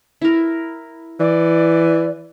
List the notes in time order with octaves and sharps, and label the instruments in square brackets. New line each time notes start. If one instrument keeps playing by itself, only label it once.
[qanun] E4 A#4
[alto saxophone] E3 [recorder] D5